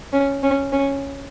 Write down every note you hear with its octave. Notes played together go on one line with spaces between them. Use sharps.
C#4
C#4
C#4